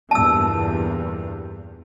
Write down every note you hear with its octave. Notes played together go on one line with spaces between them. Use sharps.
E2 G2 A#2 A5 E6